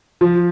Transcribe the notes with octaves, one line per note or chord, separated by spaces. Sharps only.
F3